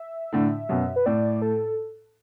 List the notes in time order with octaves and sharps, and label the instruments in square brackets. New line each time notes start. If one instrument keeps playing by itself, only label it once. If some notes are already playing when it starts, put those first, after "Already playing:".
Already playing: [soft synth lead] E5
[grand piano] A2 D3
F#2 B2
[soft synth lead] B4
[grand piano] A2 [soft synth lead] D5
[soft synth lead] A4